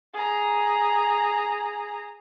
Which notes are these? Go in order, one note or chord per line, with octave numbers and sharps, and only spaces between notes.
G#4 A#5